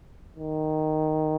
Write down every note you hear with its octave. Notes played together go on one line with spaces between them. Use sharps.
D#3